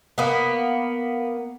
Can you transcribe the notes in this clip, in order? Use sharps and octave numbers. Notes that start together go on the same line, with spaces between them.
A#3 B3